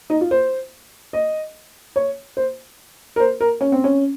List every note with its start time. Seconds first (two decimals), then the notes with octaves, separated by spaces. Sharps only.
0.10 D#4
0.21 F4
0.31 C5
1.13 D#5
1.96 C#5
2.37 C5
3.16 A#4
3.20 C5
3.41 A#4
3.61 C#4
3.72 C4
3.84 C#4